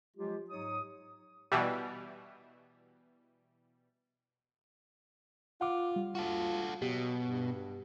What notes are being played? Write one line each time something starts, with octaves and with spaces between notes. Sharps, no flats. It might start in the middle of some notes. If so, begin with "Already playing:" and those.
F3 F#3 G#3 F4 G4
G#2 F#3 D#4 C#5 D#6
B2 E3 G3
F4 F#5 D6
G3
F4 F#4 A4
B2 F#3 G4
G2